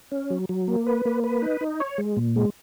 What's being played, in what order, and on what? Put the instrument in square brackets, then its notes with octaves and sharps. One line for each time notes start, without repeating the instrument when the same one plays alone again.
[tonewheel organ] C#4
F#3
F#3
A#3
B4
A#3
B4
D#4
D#4
C#5
G#3
A#2
G#3